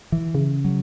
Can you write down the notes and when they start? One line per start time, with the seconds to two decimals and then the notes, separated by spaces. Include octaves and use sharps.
0.12 E3
0.35 C#3
0.65 F#3